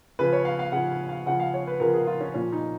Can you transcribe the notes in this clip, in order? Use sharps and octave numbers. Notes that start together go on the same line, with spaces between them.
C#3 F3 B4
C#5
F5
F5
C#3 F3 F#5
F5
C#3 F3 F#5
F5
C#5
B4
C#3 F3 A#4
G#4
F4
C#4
A#2 F3 C#4
D#4